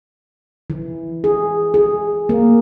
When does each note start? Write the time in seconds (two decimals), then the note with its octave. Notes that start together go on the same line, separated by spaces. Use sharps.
0.70 E3
1.24 G#4
1.74 G#4
2.29 A#3